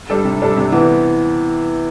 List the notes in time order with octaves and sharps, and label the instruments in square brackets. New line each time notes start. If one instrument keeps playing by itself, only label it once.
[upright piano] G3 D4 A4
C3
G3 D4 A4
C3
E3 B3